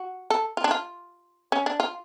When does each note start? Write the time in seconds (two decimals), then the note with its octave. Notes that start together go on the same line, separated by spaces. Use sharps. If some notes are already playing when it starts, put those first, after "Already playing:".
Already playing: F#4
0.30 A4
0.57 F4
0.64 D4
0.71 F4
1.52 C#4
1.66 D4
1.80 F4